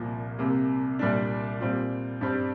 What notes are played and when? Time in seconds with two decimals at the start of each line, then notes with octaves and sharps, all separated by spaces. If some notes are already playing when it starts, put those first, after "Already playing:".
Already playing: C2 A#2 F3 A#3
0.39 C2 C3 A#3
0.99 C2 A#2 G3 D4
1.60 A#2 G3 C4 F4
2.21 G2 G3 C4